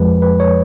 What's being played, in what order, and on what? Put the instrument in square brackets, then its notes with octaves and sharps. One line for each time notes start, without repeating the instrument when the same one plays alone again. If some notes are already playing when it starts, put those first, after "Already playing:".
Already playing: [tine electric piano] F2 F3 G#3 B4
B4
C#5